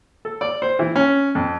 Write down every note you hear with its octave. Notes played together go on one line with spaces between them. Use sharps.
A4
D5
C5
E3
C#4
F2